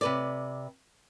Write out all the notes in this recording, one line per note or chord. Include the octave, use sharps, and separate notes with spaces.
C3 B4 D5